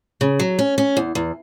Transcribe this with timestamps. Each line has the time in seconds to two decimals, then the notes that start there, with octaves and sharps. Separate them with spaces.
0.21 C#3
0.40 F#3
0.59 C#4
0.78 C#4
0.97 E2
1.15 E2